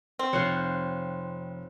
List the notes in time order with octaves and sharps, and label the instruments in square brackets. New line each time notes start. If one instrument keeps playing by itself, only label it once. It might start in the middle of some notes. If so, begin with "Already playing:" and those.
[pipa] C4
[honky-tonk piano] F1 F#6 [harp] F4 C5 C#5